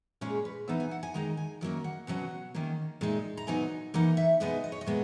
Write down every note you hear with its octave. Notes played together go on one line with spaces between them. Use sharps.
A#2 G#3 C#4 G#4
B4
E3 B3 D#4 E5
G#5
F#5
G#5
D#3 G#3 D#4 A#5
G#5
D#3 F#3 A#3 C#4
F#5
B2 F#3 C#4 F#5
D#3 A#3 C#4
A#2 G#3 D#4
A#5
A#2 F#3 B3 D#4 G#5
E3 A#3 D#4 F#5
E5
B2 G#3 B3 D#4 D#5
D#5
C#5
D#5
A#2 G#3 B3